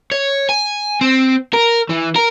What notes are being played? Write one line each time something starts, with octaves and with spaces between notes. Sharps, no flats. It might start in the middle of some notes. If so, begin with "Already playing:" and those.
C#5
G#5
C4
A#4
E3
A#4